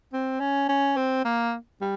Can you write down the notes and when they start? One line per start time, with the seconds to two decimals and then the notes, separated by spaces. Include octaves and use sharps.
0.13 C4
0.40 C#4
0.69 C#4
0.97 C4
1.25 A#3
1.81 G3